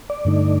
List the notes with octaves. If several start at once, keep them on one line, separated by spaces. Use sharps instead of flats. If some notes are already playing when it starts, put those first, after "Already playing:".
D5
G2 D3 A3 D#4